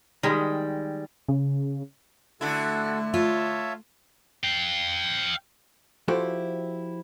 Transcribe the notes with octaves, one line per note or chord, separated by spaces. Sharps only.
D#3 G3 G#3
C#3
D3 A3 E4 F#4 A4
F4 C#5 E5 A5
F5 G5
F3 E4 F#4 G4 A4 C5